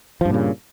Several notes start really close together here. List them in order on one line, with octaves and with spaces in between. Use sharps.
F3 G2 A#2 C#3